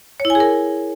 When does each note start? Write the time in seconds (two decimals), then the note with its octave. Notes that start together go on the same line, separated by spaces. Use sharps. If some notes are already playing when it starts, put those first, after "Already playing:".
0.20 C#5
0.25 E4
0.30 G#5
0.35 G#4
0.40 A#4